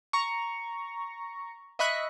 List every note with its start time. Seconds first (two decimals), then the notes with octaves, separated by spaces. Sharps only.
0.13 A#5 C#6
1.79 D#5 E5 B5 C#6 F#6